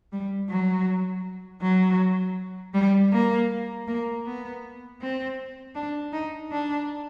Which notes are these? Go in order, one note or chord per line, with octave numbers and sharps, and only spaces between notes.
G3
F#3
F#3
G3
A#3
A#3
B3
C4
D4
D#4
D4